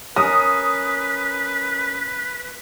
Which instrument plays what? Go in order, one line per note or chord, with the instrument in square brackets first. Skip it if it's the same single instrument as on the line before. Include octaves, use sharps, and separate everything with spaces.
[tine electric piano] C#4 A#4 A#6 [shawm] B4 [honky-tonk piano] D#6